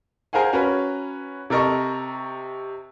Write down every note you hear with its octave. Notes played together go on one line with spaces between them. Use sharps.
G#4 A#4 C5 F5 F#5 G#5
C#4 F#4 A#4 B4
C3 A4 A#4 D#5 C#6